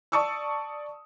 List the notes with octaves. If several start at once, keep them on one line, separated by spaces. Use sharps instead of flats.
D5 A5 C#6 D#6 E6